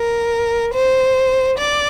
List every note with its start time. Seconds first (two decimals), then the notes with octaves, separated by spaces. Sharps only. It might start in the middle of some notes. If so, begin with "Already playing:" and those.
Already playing: A#4
0.74 C5
1.59 D5